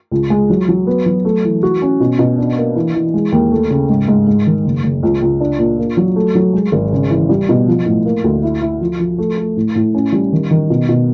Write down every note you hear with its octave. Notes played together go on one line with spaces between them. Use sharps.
C#2
G#3
F#3
F#3
B3
F#3
A3
E3
F#4
C#4
B2
B2
D4
A#3
E3
E3
G#3
D#2
A3
C#3
G#2
G#2
G#2
D#3
F#1
F#1
C#2
C#2
D4
A#2
A#3
F#3
A3
F#3
G#3
G#1
C#3
E3
G3
B2
F3
A2
A#3
D2
E4
E4
F3
F3
A3
A3
A2
A2
C#4
G3
D#3
D#3
B2
B2